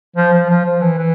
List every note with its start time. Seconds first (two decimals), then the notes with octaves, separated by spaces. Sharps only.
0.16 F3
0.33 F3
0.49 F3
0.65 F3
0.81 E3
0.98 E3